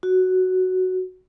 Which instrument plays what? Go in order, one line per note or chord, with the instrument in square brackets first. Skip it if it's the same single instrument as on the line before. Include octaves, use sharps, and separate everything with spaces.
[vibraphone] F#4